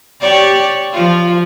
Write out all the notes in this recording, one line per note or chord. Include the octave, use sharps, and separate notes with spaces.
G4 C#5 D5
F3 F4